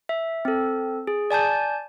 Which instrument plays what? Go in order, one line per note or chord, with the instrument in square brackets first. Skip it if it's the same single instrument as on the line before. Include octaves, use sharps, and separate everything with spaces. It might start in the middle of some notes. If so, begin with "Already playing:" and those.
[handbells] E5
C4 A4
G#4
D5 G#5 A5 G6